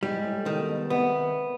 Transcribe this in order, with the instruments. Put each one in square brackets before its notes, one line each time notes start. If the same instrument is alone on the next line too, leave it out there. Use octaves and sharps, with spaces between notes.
[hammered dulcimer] G#2 [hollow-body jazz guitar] G3
[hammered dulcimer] A2
[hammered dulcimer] B2 [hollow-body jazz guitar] D#3
[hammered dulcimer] B2
[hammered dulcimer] C3 [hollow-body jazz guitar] B3